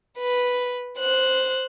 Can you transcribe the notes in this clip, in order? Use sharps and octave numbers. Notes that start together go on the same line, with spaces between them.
B4
C5 F#6